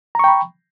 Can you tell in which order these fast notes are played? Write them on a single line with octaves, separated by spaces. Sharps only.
A#5 C#6 G5 B5